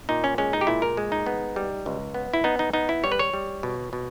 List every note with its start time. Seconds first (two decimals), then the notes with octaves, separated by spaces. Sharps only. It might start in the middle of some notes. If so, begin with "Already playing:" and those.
0.09 A#2 D#4
0.24 C#4
0.38 G#3 C#4
0.53 D#4
0.61 G4
0.67 A#2 E4
0.82 A#4
0.97 G#3
1.12 D#4
1.26 B3
1.56 G3
1.86 C#2
2.14 B3
2.34 E4
2.44 B3 D#4
2.59 D#4
2.74 B3 D#4
2.89 E4
3.04 G3 C#5
3.12 B4
3.19 C#5
3.33 G3
3.63 B2
3.93 B2